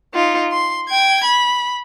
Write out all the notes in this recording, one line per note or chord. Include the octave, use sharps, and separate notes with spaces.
D#4 F4
C6
G5 G#6
B5